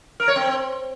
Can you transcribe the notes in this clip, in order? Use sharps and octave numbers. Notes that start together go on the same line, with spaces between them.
A#4
C#5
C4